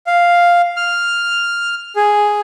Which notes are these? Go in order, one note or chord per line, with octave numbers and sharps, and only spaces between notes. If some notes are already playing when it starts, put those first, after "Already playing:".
F5
F6
G#4